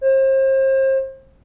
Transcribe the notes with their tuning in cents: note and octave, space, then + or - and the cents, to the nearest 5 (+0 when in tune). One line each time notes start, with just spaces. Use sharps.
C5 +35